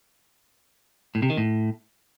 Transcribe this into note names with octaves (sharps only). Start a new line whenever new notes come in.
A2
C3
D#3
A2